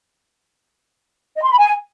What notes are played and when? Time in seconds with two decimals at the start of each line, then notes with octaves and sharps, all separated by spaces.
1.36 D#5
1.43 C6
1.50 B5
1.57 G#5